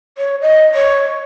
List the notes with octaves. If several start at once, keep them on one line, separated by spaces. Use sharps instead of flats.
C#5
D#5
C#5